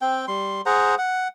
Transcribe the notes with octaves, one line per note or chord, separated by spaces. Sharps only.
C4 G5
G3 C6
G#4 C5 F#5 A#5
F#5